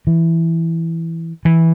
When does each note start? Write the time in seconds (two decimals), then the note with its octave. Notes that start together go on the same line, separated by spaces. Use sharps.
0.07 E3
1.45 E3